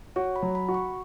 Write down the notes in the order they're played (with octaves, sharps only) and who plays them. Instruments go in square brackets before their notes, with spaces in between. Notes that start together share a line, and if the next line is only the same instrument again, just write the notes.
[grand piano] F#4 [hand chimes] C#5
[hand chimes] B5
[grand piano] F#3
[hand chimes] B5
[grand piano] F#4
[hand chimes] C#6